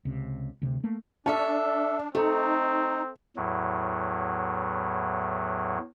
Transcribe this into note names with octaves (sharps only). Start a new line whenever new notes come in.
C#2 C3
D2 C3
A3 A#3
C#4 D4 A4 E5 A5
A3 C4 D#4 A4
E2 A2 F#3